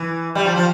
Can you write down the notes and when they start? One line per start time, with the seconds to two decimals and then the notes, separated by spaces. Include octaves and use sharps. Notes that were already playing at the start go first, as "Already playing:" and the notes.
Already playing: E3
0.35 G3
0.45 F3
0.56 F3